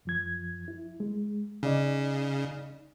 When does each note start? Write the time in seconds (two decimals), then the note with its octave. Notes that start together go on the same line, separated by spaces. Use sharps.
0.05 F#2 F3 G#6
0.68 E4
1.00 G#3
1.63 C#3 D#4 D5 D#5